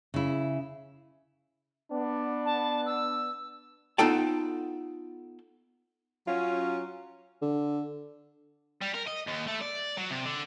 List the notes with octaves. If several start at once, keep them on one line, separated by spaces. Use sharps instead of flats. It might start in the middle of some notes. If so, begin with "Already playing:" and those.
C#3 E4
B3 D4
A5
E6
B3 D#4 F4 A4 G5 A5
F#3 C#4 F4
D3
G3
A#4
D#5
D#2
A3
D5
F#3
C3
D3